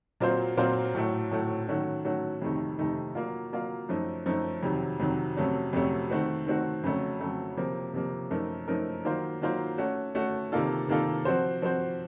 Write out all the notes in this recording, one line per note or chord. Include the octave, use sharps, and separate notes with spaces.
A#2 F#3 C4 F4 C5
A#2 F#3 C4 F4 C5
A2 F#3 A3
A2 F#3 A3
D#3 F#3 A3 C#4 F#4
D#3 F#3 A3 C#4 F#4
F2 C3 D#3 A3 D#4
F2 C3 D#3 A3 D#4
F#3 A#3 F4
F#3 A#3 F4
F#2 F3 A3 D#4
F#2 F3 A3 D#4
F2 C3 D#3 F#3
F2 C3 D#3 F#3
F2 C3 F#3 A3 C#4
F2 C3 F#3 A3 C#4
D#3 A3 C4 F#4
D#3 A3 C4 F#4
F2 C#3 F#3 A3 C#4
F2 C#3 F#3 A3 C#4
C3 F3 A#3
C3 F3 A#3
F#2 F3 A3 D#4 A#4
F#2 F3 A3 D#4 A#4
D#3 F#3 A#3 F4 C5
D#3 F#3 A#3 F4 C5
A3 C#4 F#4
A3 C#4 F#4
C3 D#3 A#3 F4 A4
C3 D#3 A#3 F4 A4
F3 C4 F#4 C5
F3 C4 F#4 C5